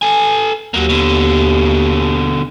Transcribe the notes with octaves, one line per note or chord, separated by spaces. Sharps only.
A4 G#5
D#2 F#3 A#3
B2 D3